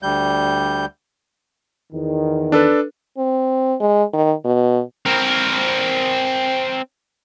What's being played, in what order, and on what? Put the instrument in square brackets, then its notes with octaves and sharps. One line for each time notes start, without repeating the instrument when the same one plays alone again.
[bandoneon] D2 G3 G6
[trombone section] E2 D#3
[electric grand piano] D4 A4 B4
[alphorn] C4
G#3
D#3
B2
[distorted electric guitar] C4 A#4